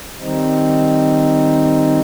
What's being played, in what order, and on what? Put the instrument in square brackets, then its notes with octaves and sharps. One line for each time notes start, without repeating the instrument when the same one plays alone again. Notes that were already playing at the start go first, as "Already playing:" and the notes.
[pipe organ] D#3 G3 C4 D#4